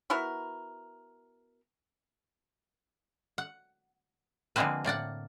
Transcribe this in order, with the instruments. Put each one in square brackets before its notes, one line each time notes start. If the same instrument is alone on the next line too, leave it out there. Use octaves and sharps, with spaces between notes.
[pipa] B3 E4 F#4 A#4
[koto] F#5
D3 F3 G#3 A#3 C4 B4
A2 A#3 D5 F#5